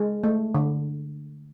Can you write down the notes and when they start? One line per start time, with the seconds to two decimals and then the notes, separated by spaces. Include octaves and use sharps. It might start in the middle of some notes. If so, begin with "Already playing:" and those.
Already playing: G#3
0.24 A3
0.54 D3